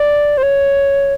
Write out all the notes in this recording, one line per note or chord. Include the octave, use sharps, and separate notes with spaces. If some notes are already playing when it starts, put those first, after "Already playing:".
Already playing: D5
C5
C#5